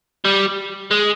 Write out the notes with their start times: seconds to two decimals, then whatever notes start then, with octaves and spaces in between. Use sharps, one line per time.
0.25 G3
0.91 G#3